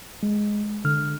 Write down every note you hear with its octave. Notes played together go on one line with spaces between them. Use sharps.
G#3
D3 F6